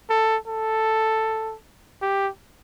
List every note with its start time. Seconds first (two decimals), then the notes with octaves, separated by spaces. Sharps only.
0.10 A4
0.47 A4
2.02 G4